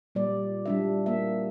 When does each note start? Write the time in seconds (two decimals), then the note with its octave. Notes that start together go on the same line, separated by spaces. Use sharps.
0.15 A#2 G3 D5
0.66 G3 D4 E5
1.06 A#3 E5